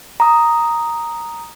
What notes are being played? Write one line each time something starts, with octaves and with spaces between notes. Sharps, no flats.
A#5 D#6